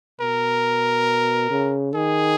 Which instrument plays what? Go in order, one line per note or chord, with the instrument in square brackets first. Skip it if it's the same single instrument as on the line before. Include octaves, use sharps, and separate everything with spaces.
[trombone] B2 [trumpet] A#4
[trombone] C#3
[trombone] D#3 [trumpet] G#4